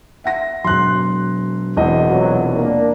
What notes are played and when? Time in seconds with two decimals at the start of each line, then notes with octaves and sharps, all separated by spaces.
0.24 E5 F#5 A#6
0.64 E1 F#3 C6 F#6
1.77 E1 E2 C4 D#5
2.09 C3 F#3 F4 B4
2.55 A#3 D4